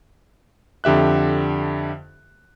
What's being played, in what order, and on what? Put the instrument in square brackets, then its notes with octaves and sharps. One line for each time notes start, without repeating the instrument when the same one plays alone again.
[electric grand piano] F2 D3 G4 E5 F#6